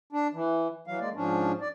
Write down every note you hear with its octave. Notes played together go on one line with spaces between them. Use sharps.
D4
E3
E3 F#3 F5
G#3 A#3 D5
G#2 F3 C#4 D4
D5